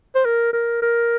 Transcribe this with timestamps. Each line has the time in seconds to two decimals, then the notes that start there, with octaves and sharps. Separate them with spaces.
0.15 C5
0.25 A#4
0.53 A#4
0.82 A#4